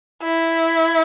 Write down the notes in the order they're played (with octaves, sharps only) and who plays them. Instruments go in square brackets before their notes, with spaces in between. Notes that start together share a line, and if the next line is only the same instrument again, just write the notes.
[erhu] E4